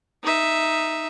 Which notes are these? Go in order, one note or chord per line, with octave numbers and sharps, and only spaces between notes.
D#4 E5